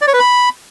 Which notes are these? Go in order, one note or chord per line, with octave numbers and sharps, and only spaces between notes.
D5
C#5
B4
B5